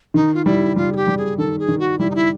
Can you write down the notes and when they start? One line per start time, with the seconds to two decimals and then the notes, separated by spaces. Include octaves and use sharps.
0.14 D#3 D#4
0.34 F4
0.45 G3 E4
0.76 G3 F4
0.93 G#4
0.96 G4
1.08 G3
1.18 G#4
1.38 D#3 A4
1.59 G#4
1.68 D#3
1.79 F#4
1.99 G3 E4
2.11 D#4
2.15 E4